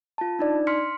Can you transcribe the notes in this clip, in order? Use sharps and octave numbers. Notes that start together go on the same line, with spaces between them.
F4 A5
D4 D#4 D5
C6 F6 B6 C#7